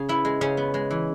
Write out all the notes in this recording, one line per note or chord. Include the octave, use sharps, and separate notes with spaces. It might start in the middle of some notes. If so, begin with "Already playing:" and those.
Already playing: C#3 G#4
B3 E4
G#3
C#3 C#4
B3
G#3
E3